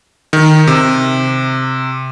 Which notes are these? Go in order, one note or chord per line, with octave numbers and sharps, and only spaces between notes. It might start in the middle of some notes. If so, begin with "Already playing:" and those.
D#3
C3